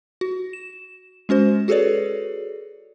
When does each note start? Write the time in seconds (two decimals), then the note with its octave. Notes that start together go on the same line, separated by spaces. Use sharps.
0.21 F#4
0.53 E7
1.29 G#3 C#4 F#4 C5
1.68 F#4 G#4 A4 B4 C#5 D5